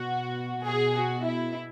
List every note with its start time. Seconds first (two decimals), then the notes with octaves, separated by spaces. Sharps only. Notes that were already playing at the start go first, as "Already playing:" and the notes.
Already playing: B2 F#4
0.66 B2 G#4
0.95 F#4
1.25 E4